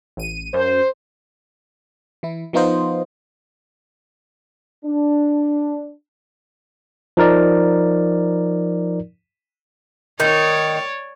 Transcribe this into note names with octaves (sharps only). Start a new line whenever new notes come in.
A1 D#7
F#2 C5
E3 E4
F3 B3 D#4 F4 C5 D#5
D4
F3 D#4 A#4 D5
D#3 C#5 D5